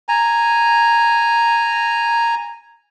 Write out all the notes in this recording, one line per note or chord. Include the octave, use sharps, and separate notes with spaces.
G#5 A#5